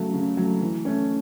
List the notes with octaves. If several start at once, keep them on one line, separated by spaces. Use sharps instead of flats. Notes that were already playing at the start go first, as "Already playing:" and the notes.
Already playing: C#3 F#3 A3
C#3
F#3 A3
E3
A3 C#4